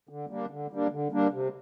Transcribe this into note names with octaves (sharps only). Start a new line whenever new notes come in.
D3
G3 A#3 D4
D3
G3 A#3 D4
D3
G3 A#3 D4
C3